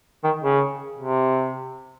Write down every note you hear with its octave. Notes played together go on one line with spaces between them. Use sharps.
D#3
C#3
C3